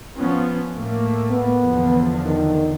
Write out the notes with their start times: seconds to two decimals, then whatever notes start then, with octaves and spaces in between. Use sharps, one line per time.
0.17 F3 B3 C#4
0.74 A2 A3 A#3
1.31 B3
1.60 E2 D3 F3
2.25 D#3